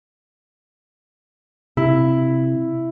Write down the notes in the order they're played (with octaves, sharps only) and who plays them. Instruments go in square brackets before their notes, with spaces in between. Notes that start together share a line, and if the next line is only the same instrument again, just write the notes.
[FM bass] C3 [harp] E4